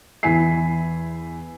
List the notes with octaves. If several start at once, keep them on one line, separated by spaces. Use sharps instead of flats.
E2 E4 G#5 B6 C7